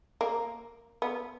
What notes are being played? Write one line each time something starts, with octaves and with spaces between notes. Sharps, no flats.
A#3
B3